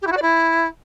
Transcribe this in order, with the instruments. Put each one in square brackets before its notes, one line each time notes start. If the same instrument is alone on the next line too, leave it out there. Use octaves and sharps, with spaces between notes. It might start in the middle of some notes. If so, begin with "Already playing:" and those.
[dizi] G4
E4
F#4
D5
E4